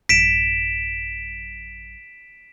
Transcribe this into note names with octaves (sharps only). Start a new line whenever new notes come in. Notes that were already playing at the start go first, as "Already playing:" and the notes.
A1 F#2 B6 D7 E7